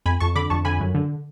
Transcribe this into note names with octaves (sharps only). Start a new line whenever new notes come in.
F2 G#5 B5
F2 A5 C#6
D3 B5 D6
F2 A5 C#6
D3 G#5 B5
F#2
D3